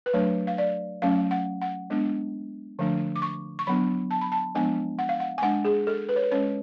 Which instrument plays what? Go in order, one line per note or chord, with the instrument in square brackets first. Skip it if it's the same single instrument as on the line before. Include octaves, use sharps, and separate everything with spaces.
[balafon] B4
F#3 A3 D4 C#5
F5
D5
F#3 A3 C#4 F5
F#5
F#5
G#3 B3 D4
D3 F3 A3 D4
D6
C#6
C#6
F#3 B3 D4 B5
A5
B5
A5
F3 G#3 B3 D4 G#5
F#5
F5
F#5
G#5
G#3 D4 F#5
G#4
A4
B4
C#5
B4
G#3 C#4 C#5